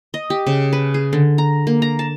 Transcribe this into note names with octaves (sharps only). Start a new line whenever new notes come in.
D#5
G4
C#3
B4
G#4
D3
A#5
A#3
A#5
A5